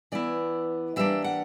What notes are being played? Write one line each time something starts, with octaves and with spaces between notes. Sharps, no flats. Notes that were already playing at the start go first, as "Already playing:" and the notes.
E3 B3 E4 D5
E3 G3 A#3 D4 E5
F#5